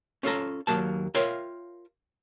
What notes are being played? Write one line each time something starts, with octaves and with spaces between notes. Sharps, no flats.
C#4 F4 A4 A#5
D#2 F3 F#3 A#3 A5
F4 A#4 C#5 E5 F5 G5